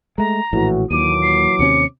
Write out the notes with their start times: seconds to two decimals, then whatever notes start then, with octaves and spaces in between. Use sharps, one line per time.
0.18 G#3 A3 A#5
0.53 A#1 A2 E3 F#4
0.91 D#2 A#2 E3 F#3 D6 D#7
1.22 C7
1.59 D#2 C3 C#4 C#7